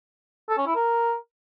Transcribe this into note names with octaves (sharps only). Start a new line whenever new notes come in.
A4
C#4
E4
A#4